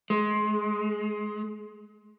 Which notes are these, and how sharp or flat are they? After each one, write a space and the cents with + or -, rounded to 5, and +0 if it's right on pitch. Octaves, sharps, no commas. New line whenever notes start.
G#3 +25